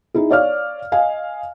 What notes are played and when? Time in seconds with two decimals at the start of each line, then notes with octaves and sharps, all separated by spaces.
0.14 D#4 E4 G#4
0.31 C#5 D5 F5 F6
0.92 D#5 F5 G#5